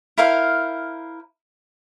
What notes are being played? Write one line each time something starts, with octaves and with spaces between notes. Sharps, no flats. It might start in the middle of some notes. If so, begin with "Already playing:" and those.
E4 A#4 C5 F5